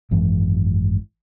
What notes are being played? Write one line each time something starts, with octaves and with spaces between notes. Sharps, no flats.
G#1 F#2 E3 G#3